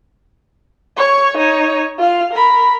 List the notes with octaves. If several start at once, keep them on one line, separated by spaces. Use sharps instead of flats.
C#5 C#6
D#4 C#5
F4 F5
A#4 B5